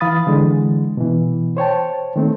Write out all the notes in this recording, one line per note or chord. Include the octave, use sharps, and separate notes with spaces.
E3 F5 B5 D#6 A6
D3 E3 G#3
B2 E3
C5 C#5 G5 A5
D#3 A3 C4